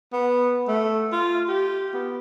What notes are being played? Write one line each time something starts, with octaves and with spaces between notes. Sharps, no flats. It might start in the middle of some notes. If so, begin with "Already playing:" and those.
B3
A3
F4
G4
B3